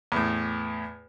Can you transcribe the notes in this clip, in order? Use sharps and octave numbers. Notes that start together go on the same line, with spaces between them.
E2 A2